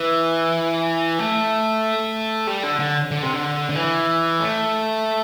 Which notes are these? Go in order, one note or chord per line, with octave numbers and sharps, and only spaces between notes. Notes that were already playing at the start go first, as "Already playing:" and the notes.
Already playing: E3
A3
G3
D3
D3
D3
C3
D3
D3
E3
A3